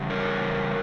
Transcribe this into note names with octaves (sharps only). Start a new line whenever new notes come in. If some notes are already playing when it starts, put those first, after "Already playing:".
Already playing: E2 C#3 G3
A#4 C#5